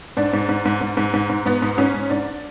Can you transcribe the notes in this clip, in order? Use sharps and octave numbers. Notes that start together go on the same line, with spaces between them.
G#2 D4
G#2
G#2
G#2
G#2
G#2
G#2
G#2
G#2 B3
G#2
G#2 C#4
G#2
G#2 D4